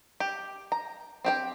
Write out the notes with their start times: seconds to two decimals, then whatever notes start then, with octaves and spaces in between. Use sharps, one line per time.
0.20 G4
0.72 A#5
1.25 C4 G4 G5